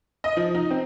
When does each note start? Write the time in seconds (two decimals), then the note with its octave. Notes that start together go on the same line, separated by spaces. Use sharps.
0.24 D#5
0.37 F3
0.55 D#4
0.71 C4